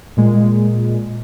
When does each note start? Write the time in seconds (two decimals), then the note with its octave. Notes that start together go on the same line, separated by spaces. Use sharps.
0.17 A#2 G#3